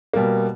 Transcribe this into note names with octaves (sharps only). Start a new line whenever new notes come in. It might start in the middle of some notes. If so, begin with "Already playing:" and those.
B2 G3 A#3